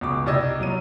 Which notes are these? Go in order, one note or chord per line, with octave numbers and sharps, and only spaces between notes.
C#2 B2 D6
C2 G4 D5 D#5 E6 G#6
C2 F#3 D#5 D#7